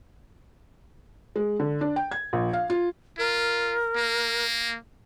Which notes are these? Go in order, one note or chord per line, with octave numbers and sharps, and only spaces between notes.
G#3
D3
D4
G5
G#6
A#1
F5
F4
F4 A#4
A#3